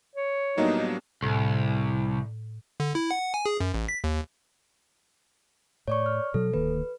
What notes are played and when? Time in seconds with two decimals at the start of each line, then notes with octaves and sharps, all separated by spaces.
0.15 C#5
0.58 A2 F#3 G3 A#3 B3 D4 D#4
1.22 C2 A2
2.80 D3
2.95 E4
3.11 F#5
3.34 G#5
3.46 G#4
3.60 F#2
3.74 A1
3.89 B6
4.04 D#2
5.88 A2 C#5 D5 C#6
6.06 F6
6.34 B2 F#3 A4
6.54 D1 D#3 A#3 B4